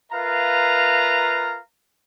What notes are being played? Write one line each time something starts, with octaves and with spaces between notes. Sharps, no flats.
F4 A#4 B4 E5 F5 A#5